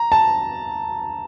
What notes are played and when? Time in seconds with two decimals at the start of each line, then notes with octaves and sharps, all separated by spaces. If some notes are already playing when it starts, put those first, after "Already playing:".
Already playing: A#5
0.12 A5